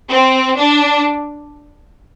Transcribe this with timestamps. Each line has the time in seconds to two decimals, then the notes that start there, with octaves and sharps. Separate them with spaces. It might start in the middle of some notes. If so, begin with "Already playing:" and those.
0.11 C4
0.58 D4